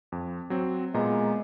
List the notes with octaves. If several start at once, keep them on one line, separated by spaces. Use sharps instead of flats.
F2
F#3 C4
A#2 G#3 B3 A#5